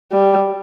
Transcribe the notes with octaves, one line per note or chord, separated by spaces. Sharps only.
G3